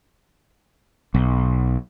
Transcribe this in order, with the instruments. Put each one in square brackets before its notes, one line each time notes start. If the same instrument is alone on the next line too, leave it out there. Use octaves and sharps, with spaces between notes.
[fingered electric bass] B1